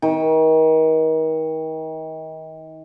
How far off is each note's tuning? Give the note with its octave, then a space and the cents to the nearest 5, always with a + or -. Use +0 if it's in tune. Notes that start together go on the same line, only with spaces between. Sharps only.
D#3 +35